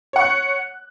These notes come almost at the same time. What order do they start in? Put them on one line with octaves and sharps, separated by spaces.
C#5 F#5 C#6 F#6